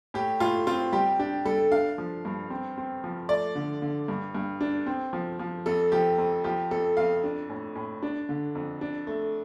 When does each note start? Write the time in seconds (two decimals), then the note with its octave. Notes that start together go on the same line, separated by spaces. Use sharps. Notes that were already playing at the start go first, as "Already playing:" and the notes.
0.14 A2 G4
0.40 A2 F4
0.67 C4 F4
0.93 G3 G4
1.19 D4 G4
1.45 G3 A4
1.71 D4 F5
1.98 F3
2.25 G2
2.50 C4
2.78 C4
3.04 F3
3.29 A3 D5
3.55 D3
3.82 D3
4.08 G2
4.35 G2
4.61 D4
4.87 C4
5.13 F3
5.39 F3
5.66 F2 A4
5.92 F3 G4
6.18 F2
6.44 F3 G4
6.71 F2 A4
6.97 F2 F5
7.24 D4
7.49 A2
7.76 A2
8.03 D4
8.29 D3
8.55 F2
8.81 D4
9.07 A3